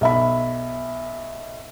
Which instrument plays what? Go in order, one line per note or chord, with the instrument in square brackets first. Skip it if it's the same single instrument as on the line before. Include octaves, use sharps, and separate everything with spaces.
[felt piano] B1 E5 B5